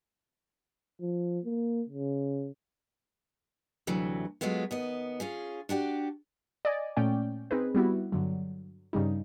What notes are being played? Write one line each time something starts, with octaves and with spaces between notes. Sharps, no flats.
F3
A#3
C#3
D2 C3 E3 F#3
F#3 G#3 A3 B3 F4
D#2 B3 D#5
C#4 F4 G#4
D4 F#4 G4 D5
D5 D#5 G#5
A#2 A3 C#4 D5 G5
C4 D#4 G#4 B4
G3 B3 E4 F#4
G2 D3 F#3
G2 C#3 G3 D#4